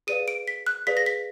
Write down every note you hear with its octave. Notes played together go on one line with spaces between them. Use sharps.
G#4 B4 D5 F5 D#7
D7
B6
F#6
G#4 B4 D5 F5 B6
A#6
B6